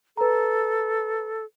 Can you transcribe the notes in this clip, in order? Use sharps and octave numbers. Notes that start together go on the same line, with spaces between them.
A4 B4 A#5